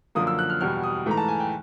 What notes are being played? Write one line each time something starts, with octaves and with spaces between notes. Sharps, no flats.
F#2 D3 F3 A#3 D#6
E6
F#6
F6
E2 B2 G3 F6
D#6
G#2 E3 A3 A#5
A5
G#5
G5